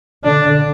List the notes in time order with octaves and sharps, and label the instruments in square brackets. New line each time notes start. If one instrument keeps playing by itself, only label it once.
[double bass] D3 [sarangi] D4